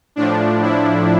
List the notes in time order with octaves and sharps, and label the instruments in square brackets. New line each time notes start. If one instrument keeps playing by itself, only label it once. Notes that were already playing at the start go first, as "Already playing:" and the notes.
[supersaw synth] A2 F3 D4
E4